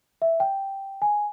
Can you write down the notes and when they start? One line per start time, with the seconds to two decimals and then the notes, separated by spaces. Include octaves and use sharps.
0.22 E5
0.40 G5
1.02 G#5